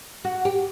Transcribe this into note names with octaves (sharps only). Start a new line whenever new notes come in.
F#4
G4